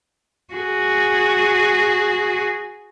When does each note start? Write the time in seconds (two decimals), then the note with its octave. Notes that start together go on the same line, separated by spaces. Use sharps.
0.54 F#4 G#4